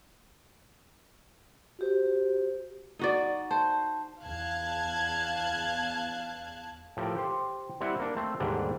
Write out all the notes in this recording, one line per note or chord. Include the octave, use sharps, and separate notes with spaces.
F#4 G4 C5
D#4 F#4 D5
C5 A5
E2 F5 A5 F#6 G#6
A2 F3 G4 A4 A#4
G4 C5
G3 C4 E4 E5 F#5
A#3 D4
A3 C4 A4 C5
D#2 G#2 B2 D3 G3 D4